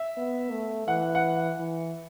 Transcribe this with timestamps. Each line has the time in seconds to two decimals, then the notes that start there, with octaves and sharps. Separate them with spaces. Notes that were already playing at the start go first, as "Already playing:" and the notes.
Already playing: E5
0.17 B3
0.52 A3
0.88 E3 F#5
1.15 F#5
1.60 E3